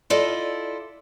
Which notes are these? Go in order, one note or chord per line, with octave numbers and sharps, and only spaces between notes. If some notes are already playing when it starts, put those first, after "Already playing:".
E4 F4 A4 D5 D#5